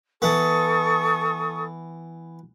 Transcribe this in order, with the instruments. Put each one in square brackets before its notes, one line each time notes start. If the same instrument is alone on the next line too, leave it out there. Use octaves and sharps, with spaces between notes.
[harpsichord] E3 B3 [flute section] A4 C#6 D#6